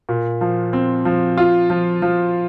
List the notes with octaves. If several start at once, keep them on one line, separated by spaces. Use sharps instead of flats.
A#2
F3
C4
F3
F4
F3
F3